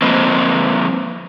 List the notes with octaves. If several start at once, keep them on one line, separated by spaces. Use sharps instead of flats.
F3 A#3 C4 B4 C5 D#5